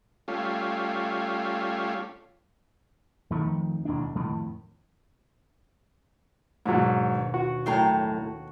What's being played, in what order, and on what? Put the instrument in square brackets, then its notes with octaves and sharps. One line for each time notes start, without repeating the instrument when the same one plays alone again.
[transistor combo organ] G3 A3 C#4 F4
[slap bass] F2 D#3 F3 A3
E1 D#2 A2 D4
F2 A2 D#3
[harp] D#2 B2 D4 [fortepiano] G#2 F#3
[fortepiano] F#4
[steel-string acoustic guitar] F#2 A2 A#5 [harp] G5 C7